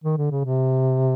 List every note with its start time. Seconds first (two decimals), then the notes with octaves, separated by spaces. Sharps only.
0.04 D#3
0.18 D3
0.31 C#3
0.44 C3